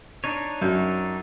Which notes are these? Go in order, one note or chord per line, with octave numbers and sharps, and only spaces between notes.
D4 D#4 C#5
F#2